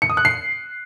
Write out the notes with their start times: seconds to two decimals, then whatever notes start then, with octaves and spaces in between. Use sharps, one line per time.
0.02 C#7
0.10 D#6
0.17 F#6
0.25 C7